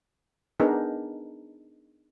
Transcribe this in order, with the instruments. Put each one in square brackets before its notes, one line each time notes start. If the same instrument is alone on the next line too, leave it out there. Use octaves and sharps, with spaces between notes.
[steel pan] B3 D4 D#4 G#4 A#4 B4